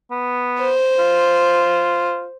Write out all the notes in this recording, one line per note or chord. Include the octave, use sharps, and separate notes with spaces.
B3
C5
F4